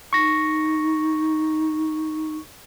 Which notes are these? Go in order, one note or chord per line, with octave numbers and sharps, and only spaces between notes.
D#4 C#6 A#6